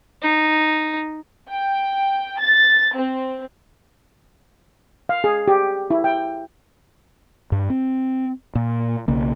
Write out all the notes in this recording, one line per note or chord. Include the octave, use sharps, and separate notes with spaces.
D#4
G5
A6
C4
F5
G#4
G4
E4
G5
G2
C4
A#2
B1 C#3 A#3